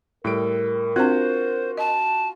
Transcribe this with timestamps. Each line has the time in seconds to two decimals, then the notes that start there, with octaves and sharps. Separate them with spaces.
0.24 A2 G3 A4 A#4 D7
0.96 C4 D4 F4 F#4 C5 F#6
1.78 D#5 A5